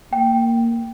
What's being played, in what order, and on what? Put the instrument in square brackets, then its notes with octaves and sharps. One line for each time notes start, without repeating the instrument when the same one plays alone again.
[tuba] A#3 [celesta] G5